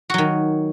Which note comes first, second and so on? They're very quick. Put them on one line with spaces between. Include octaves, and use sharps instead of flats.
F#4 F#3 D#3